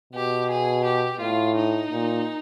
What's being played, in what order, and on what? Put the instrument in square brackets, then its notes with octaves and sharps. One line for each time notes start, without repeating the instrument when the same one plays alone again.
[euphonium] B2 [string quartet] G4
[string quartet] G#4
G4
[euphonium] A2 [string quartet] F4
[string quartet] D#4
[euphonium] A#2